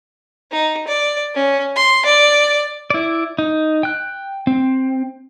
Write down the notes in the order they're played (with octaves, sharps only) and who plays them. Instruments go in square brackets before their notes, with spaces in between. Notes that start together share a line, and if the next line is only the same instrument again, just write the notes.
[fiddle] D#4
D5
C#4
C6
D5
[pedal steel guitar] E4 D5
D#4
G5 F#6
C4